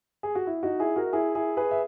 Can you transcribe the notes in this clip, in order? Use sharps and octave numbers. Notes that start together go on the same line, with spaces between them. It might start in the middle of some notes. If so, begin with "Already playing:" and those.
G#4
F#4
E4
D#4 F#4
E4 G#4
F#4 A#4
E4 G#4
E4 G#4
G#4 B4
E5